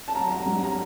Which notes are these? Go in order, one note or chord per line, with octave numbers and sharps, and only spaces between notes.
A5
F#3 A#5
F#3 A#5
G2
A#5